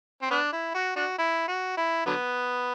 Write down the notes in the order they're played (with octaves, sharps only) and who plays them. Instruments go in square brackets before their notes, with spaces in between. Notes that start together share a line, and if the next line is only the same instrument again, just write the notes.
[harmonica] C4
B3 D4
E4
F#4
D4 F#4
E4
F#4
E4
D3 F#3 B3